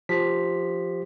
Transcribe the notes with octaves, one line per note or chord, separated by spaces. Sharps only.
F3 G4 B6